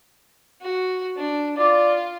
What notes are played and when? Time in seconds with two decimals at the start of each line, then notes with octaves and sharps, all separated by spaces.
0.62 F#4
1.16 D4
1.57 F4 D5